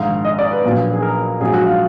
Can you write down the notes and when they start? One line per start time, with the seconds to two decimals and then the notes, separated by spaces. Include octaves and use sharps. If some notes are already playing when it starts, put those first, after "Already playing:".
Already playing: A#1 G#2 D#3 F5
0.25 D#5
0.39 D5
0.51 B4
0.64 A#1 A#2 F#3 A#3
0.93 G#4
1.02 A#4
1.40 A#1 G#2 F#3 A#3 G#4
1.54 F#4
1.66 F4